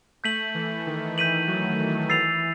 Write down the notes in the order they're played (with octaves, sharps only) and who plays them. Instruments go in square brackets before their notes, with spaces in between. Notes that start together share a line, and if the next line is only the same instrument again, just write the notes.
[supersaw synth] A3 [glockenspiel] G6 B6 D#7 F#7
[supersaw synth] E3
D#3
[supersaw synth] E3 [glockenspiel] G6 B6 D#7 F#7
[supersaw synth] F#3
E3
[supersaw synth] E3 [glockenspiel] E6 A6 C7 F7